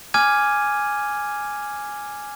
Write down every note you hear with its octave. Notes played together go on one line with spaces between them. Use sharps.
G#5 D6 F6 G#6 D#7